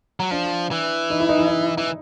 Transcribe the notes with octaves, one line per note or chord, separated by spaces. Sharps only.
F#3
F3 D4
E3
D#4
E4
D#4
E4
D#4
E3